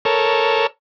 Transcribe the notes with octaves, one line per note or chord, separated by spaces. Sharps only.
A4 A#4 C#5